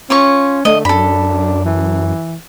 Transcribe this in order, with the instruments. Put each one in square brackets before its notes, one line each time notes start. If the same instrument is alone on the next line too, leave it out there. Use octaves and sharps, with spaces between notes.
[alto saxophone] C#4 [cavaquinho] F4 C#5 C#6
[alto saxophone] D3 [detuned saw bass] A3 [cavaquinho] D#5
[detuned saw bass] F#2 [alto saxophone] D4 [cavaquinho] A4 B5
[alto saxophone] E3